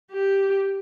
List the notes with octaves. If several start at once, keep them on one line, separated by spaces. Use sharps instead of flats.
G4